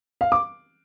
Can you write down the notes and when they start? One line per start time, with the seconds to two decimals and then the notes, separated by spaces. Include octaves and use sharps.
0.21 F5
0.32 D6